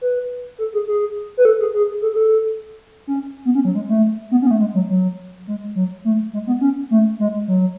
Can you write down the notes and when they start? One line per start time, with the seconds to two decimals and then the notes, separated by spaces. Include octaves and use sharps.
0.01 B4
0.59 A4
0.74 G#4
0.88 G#4
1.37 B4
1.45 A4
1.60 G#4
1.74 G#4
2.02 A4
2.13 G#4
2.16 A4
3.07 C#4
3.45 B3
3.55 C#4
3.65 F#3
3.75 G#3
3.89 A3
4.31 B3
4.42 C#4
4.47 B3
4.51 A3
4.60 G#3
4.74 F#3
4.90 F#3
5.47 G#3
5.75 F#3
6.05 A3
6.33 G#3
6.47 B3
6.61 C#4
6.91 A3
7.20 G#3
7.48 F#3